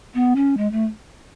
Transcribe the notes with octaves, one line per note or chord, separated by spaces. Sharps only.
B3
C#4
G#3
A3